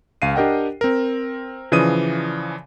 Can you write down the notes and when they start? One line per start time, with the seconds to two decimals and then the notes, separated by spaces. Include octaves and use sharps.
0.22 C#2 F5 C7 D#7
0.35 D4 G4 A#4 D#5 F#5 G5
0.81 C4 A#4
1.72 C#3 E3 F3 D5 D#6 D#7